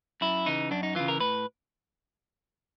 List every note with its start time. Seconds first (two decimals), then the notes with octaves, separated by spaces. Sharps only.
0.21 F#2 E4
0.46 C#3 E3 D#4
0.71 F#2 D4
0.83 D#4
0.95 C#3 E3 F4
1.08 A#4
1.20 A2 B4